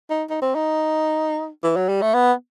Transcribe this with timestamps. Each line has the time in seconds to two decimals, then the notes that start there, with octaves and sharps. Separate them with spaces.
0.10 D#4
0.30 D#4
0.42 C4
0.55 D#4
1.63 E3
1.76 F#3
1.88 G3
2.01 A3
2.14 B3